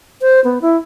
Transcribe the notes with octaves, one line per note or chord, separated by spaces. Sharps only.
C5
B3
E4